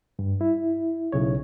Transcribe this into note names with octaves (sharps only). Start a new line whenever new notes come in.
G2
E4
B1 C#3 C#5